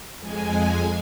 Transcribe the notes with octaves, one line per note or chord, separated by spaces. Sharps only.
F2 G#3 G#5